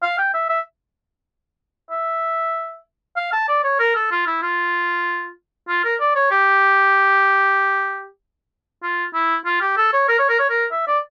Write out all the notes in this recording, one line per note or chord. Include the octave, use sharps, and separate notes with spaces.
F5
G5
E5
E5
E5
F5
A5
D5
C#5
A#4
A4
F4
E4
F4
F4
A#4
D5
C#5
G4
F4
E4
F4
G4
A4
C#5
A#4
C#5
A#4
C#5
A#4
E5
D5